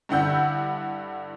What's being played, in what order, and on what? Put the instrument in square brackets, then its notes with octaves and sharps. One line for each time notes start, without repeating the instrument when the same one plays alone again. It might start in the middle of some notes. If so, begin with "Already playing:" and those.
[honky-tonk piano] G2 D3 E4 F#5 E6 G6